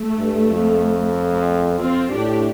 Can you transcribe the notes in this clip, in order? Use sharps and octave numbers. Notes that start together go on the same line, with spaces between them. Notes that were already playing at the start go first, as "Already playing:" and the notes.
Already playing: A3
G2
F2
F2 C4 F4
A2 D4 G4